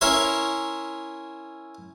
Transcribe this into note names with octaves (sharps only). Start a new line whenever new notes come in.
C#4 E4 A#4 C#5 E5 C6